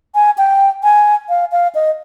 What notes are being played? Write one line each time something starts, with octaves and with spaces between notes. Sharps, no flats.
G#5
G5
G#5
F5
F5
D#5